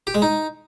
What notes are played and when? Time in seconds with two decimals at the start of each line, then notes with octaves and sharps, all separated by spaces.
0.07 G4
0.15 G#3
0.22 D#4